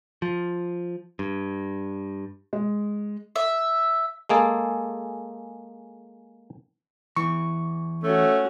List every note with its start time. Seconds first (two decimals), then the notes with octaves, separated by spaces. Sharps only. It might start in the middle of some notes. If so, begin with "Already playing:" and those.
0.22 F3
1.19 G2
2.53 G#3
3.36 E5
4.29 G#3 A#3 G#4 A4
7.16 E2 E3 C#6
8.04 A3 C#4 F#4